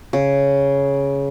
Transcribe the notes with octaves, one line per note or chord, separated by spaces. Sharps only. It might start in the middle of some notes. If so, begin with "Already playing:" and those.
C#3